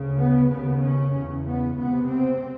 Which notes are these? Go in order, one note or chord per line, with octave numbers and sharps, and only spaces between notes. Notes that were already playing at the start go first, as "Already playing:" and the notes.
Already playing: D2 C#3
B3
D#2 C#3 B3
C#4
E2 C#3
B3
C#2 C3 B3
C4